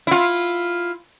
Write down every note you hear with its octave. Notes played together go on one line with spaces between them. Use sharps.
E4 F4